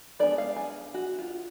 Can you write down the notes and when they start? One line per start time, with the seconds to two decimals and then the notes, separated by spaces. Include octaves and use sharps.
0.19 G#3 B3 D4 D5
0.38 F5
0.56 G#5
0.94 F#4
1.19 F4